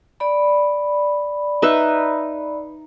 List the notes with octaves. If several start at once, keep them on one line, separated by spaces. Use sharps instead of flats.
D5 B5
D#4 B4 E5